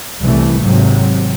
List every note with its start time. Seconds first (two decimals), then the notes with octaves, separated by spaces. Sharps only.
0.22 C2 E3 A3
0.63 G#1 C3 F#3